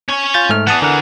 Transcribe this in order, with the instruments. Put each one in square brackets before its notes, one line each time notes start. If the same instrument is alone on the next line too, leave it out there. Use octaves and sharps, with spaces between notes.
[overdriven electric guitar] C#4 C#5
[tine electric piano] F4 G6 A6
G#2 A3 F6
[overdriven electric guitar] E3 G#4 [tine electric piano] F#5 A5 D#6
[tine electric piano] D3 A#4 F#5